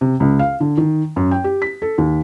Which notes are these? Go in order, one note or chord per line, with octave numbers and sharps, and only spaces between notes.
C3
C#2
F5
D3
D#3
F#2
G5
G4
B6
A4
D#2